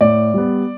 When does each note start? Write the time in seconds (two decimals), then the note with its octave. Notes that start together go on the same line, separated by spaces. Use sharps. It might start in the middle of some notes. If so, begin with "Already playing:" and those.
0.01 A2 D5
0.34 G3 B3